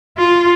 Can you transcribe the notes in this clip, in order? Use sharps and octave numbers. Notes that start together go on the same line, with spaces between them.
F4